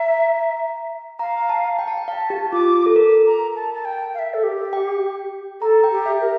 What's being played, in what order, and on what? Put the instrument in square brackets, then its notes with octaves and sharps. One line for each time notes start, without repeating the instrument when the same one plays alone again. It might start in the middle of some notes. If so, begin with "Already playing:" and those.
Already playing: [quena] E5 [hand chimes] A#5
[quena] F5 [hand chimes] A#5
[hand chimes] A5
G5
A5
G5
[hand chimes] F5 [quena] A5
[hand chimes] G4
[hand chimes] F4 [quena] D6
[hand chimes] A4
A#4
[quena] A#5
A5
A5
G5
F5
E5
A4
G4
[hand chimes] G5
[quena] A4 [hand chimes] A#5
[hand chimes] G5
[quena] G4
[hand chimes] E5
[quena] A#4